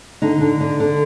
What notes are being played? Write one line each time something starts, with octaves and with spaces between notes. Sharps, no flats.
D3 D#4
D3
D3
D3